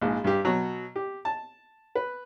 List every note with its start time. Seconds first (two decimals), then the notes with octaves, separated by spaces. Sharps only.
0.02 A#1 G#2
0.24 G2 G4
0.45 B2 F#3
0.96 G4
1.25 A5
1.95 B4